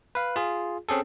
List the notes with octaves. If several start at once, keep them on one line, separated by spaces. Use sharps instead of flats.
B4 F5
F4 G#4
C4 C#4 G#4 A4